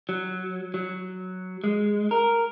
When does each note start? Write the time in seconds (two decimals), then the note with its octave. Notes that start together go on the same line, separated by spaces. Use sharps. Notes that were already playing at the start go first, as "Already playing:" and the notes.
0.09 F#3
0.74 F#3
1.64 G#3
2.11 A#4